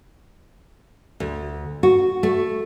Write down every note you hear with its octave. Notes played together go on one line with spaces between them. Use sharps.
D2
F#4
A3